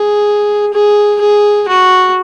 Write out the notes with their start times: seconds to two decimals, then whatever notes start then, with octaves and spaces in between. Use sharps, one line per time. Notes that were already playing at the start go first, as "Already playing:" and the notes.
Already playing: G#4
0.74 G#4
1.21 G#4
1.69 F#4